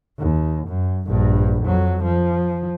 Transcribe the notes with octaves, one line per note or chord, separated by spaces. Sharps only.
D#2
F#2
A#1 G2
F2 F#3
F3